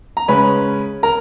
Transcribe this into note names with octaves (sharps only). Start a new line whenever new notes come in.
A#5
C#3 G#3 C#4 B4 B5
A#4 A#5